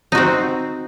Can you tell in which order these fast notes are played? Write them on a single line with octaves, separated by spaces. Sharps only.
D#4 F#4 C4